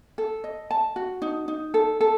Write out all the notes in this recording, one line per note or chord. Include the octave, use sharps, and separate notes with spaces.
A4
D#5
A5
F#4
D#4
D#4
A4
A4